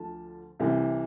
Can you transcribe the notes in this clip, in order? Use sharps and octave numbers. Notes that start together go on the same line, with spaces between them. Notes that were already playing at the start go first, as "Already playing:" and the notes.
Already playing: D2 D3 F3 A5
C2 C3 E3